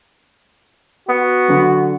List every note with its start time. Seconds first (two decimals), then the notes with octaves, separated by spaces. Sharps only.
1.09 B3 F#4
1.48 D3 F#3